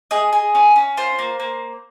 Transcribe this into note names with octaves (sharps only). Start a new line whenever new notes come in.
G#4 D#5
G#4
C#4
C#4
F4 C5
A#3
A#3